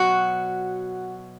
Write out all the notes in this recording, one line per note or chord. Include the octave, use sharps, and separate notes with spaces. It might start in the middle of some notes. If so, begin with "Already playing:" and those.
Already playing: B2 F#3 F#4